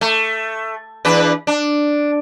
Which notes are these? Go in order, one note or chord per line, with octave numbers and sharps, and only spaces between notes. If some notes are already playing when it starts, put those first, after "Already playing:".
A3
E2 D4 B4
D4